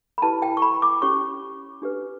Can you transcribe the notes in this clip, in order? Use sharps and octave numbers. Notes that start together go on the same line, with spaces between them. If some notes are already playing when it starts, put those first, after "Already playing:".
B5
E4 G4 B4 A5
G5
C#6
B5
D6
C#4 G4 C#5 C#6
D4 G4 B4